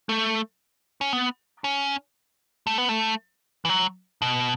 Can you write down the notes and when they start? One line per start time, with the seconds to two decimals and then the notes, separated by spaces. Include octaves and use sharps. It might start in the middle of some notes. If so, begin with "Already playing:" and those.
0.09 A3
1.01 C#4
1.13 B3
1.64 C#4
2.67 A3
2.78 B3
2.89 A3
3.65 E3
3.69 F#3
4.22 B2